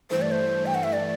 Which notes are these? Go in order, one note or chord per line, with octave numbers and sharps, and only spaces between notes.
G2 E3 A3 C5
D5
C5
G5
F#5
E5
D5